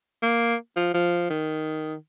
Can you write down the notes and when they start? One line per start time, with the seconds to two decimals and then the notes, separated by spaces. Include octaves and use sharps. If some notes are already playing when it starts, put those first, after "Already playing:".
0.23 A#3
0.76 F3
0.94 F3
1.30 D#3